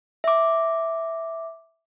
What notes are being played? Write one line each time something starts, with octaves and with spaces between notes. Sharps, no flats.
E5 D6